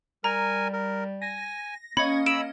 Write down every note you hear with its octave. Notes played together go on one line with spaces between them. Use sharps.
G3 A#4 G#5 A#5
A#4
G#5 A#6
A#3 C#4 D#5 B5 C#6
B5 E6 D7 E7